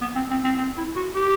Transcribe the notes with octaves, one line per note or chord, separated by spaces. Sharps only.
B3
C4
C4
C4
C4
E4
F#4
G4